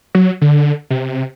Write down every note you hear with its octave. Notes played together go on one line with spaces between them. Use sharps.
F#3
D3
C3